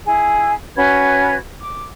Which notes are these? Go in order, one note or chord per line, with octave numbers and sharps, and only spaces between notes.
E4 G#4
C#4 F#4 B4 G#6
D6